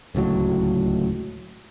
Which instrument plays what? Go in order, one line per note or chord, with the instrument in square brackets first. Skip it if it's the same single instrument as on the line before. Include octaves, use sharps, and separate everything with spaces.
[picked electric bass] D1 C#2 A2 F#3